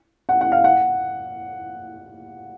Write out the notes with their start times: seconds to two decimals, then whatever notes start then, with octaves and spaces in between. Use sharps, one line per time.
0.29 F#5
0.41 F#5
0.52 F5
0.64 F#5